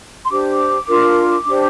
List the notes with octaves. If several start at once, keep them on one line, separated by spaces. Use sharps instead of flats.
C6
D4 G4 C5 D6
D4 F4 A#4
D4 G4 C5